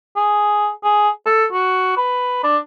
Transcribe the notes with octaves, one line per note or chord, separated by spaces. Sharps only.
G#4
G#4
A4
F#4
B4
D4